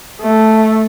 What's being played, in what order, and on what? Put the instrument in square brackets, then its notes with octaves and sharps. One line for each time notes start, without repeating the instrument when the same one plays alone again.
[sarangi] A3